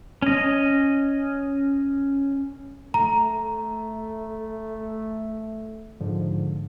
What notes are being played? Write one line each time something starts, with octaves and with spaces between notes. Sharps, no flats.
C#4 D#5
A3 A#5
G#2 D3 F3